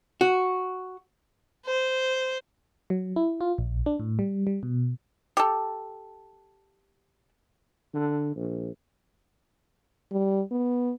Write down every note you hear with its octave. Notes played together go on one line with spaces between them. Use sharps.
F#4
C5
F#3
E4
F4
A#1
D4
A2
G3
G3
B2
G4 A4
D3
A#1
G3
B3